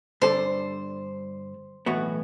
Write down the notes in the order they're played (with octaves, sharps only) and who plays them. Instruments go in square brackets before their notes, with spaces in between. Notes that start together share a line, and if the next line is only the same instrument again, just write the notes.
[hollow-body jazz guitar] G2 D3 G3 D4 A4 [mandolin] C5
[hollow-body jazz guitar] B1 A2 E3 B3 F#4